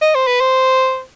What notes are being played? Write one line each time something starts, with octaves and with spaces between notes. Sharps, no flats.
D#5
C5
B4
C5